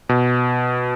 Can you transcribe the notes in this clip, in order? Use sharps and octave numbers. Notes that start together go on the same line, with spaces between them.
B2